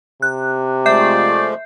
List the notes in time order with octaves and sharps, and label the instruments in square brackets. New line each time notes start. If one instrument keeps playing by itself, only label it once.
[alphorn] C3 [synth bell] F#6
[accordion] F3 G#3 A3 [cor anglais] D5 [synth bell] E5 G6 C7